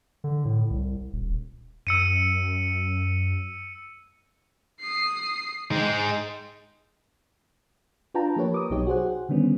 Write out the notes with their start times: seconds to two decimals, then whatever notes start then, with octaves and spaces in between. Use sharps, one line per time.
0.24 D3
0.45 A2
0.70 C2
1.13 D#1
1.87 F#2 E6 C#7 D#7
4.81 D#6 C7
5.71 G#3 D#4 G5
8.14 D4 F4 B4 G5 A5 A#5
8.36 F3 A#3 G4 A#4 B4 C#5
8.54 D6 D#6
8.70 B1 B2 F#3 D#4 G4 C#5
8.87 F#4 G#4 C5 F#5
9.29 D3 D#3 G3 B3 C#4